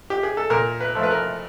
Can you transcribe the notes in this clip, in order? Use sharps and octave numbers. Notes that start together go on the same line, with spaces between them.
G4
G#4
A4
A#2 A#4
B4
F3 A3
B4
A#4